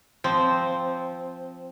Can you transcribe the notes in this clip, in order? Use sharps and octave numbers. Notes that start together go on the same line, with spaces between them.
F3 C4